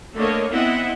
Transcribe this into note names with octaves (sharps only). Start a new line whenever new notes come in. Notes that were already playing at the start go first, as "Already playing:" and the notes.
D3 A3 A#3 A#4 C#5 D#5
B3 C4 E4 D#5 E5 F#5